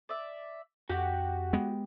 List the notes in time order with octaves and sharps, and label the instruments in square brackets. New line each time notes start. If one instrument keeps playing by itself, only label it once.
[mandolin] D5 E5
[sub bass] F2 [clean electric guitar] F#4 F#5 [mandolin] G4
[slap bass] G#3 B3